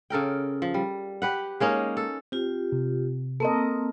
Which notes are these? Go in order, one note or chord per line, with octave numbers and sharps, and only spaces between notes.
C#3 A4 A#4 G5
F3
G3
G4 B4 F#5
G#3 A#3 C#4 D#4
A4
C4 F4 G4
C3
A#3 C4 A4 A#4 D#5